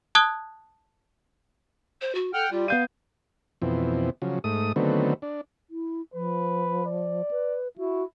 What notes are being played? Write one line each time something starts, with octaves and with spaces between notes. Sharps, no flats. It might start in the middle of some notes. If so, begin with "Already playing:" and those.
A5 D#6 F#6 G#6 G7
C5
F#4
A4 F#5 G5 F6
G3 F4
B3 F5 G6 D#7
F2 B2 E3 C4
C#3 F3 F#3
G#2 A3 D#6
D3 D#3 F#3 A3 B3 C4
D4
E4
F3 B4
D5
B4
E4 F#4